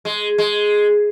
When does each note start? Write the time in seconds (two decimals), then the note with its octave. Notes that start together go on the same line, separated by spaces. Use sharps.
0.05 G#3
0.38 G#3